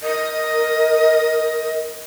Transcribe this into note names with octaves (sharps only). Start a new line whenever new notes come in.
A#4 D#5